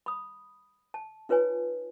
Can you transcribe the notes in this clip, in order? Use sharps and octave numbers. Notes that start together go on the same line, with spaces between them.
B5 D#6
A5
D#4 F4 B4 C#5 G#5